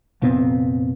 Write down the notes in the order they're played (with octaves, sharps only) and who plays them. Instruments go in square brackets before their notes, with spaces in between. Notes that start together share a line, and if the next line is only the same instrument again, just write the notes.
[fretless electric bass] F1 A#2 B3 C4